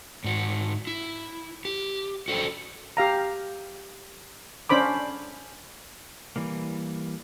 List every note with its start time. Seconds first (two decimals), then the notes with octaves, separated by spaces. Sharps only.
0.24 G#2 F#4
0.87 E4
1.65 G4
2.28 F#4 A4 C5 G5
2.97 G4 F5 A#5
4.69 C#4 D4 C5 B5 D6
6.36 E3 G3 A#3